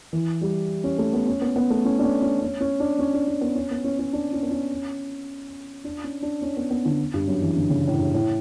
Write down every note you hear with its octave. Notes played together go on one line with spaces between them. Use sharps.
E3
G3
C#4
A3
B3
C#4
B3
B3
A3
C#4
D4
C#4
C#4
C#4
C#4
D4
C#4
D4
C#4
B3
C#4
B3
C#4
C#4
D4
C#4
B3
C#4
D4
C#4
D4
C#4
B3
B3
D3
G2
F#2
E3
D3
C#3
A2
G2
A2